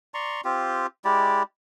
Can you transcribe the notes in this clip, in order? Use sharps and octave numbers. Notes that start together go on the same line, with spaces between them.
D5 A#5 C6 C#6
C4 F4 G4
G#3 E4 G4 D5